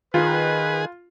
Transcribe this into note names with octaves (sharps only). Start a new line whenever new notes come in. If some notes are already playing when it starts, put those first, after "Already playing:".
D#3 F4 G#4 B4